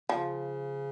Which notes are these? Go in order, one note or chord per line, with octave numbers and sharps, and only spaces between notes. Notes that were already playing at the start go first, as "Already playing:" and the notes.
C#3 F3